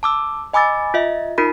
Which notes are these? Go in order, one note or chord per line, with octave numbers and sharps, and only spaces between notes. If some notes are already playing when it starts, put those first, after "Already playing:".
A5 D6 E6
D#5 G#5 B5 D6 E6 A6
F4 D#5 E5
D#4 F4 A#4 B5